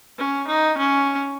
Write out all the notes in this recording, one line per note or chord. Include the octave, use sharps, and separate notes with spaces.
C#4
D#4
C#4